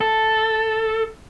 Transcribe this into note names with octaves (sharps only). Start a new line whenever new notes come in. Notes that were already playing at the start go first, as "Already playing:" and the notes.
A4